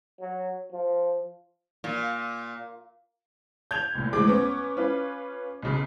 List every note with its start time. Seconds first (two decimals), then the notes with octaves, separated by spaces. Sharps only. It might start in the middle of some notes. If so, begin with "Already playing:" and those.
0.20 F#3
0.72 F3
1.84 A#2
3.71 G6 G#6 F7
3.95 C2 A#2
4.13 D2 G#2 E3 G#3 D6
4.27 B3 C#4
4.77 C#4 F4 B4
5.63 B1 C#3